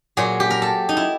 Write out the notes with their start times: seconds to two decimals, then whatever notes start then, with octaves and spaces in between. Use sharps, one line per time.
0.17 A#2 F#3 G#4
0.40 G4
0.50 A#4
0.62 A4
0.89 D#4
0.97 E4